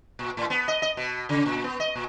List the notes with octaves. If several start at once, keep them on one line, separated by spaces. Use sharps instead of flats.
A#2
A2
B3
D#5
D#5
B2
C#3
A#2
B3
D#5
A#2